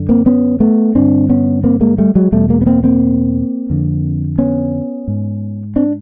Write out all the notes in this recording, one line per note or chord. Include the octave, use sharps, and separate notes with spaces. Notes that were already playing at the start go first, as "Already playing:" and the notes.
Already playing: F#2 D3
A#3 C4
B3 C#4
A3 B3
G2 D3 C4 D4
B3 C#4
A#3 C4
G#3 A#3
G3 A3
F#3 G#3
E2 B2 G3 A3
G#3 A#3
B3
A#3 C4
A#3 C4
F2 D3
B3 C#4
G#2
C4 D4